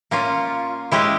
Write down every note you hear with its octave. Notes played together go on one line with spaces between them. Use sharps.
A#3 C#4 F4
G#3 C#4 E4 G4